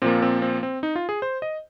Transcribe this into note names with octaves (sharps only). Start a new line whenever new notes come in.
A#2 F3 A#3 C4
C4
C4
C4
D#4
F4
G#4
C5
D#5